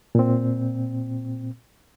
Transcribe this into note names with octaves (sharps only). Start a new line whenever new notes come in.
A#2 C4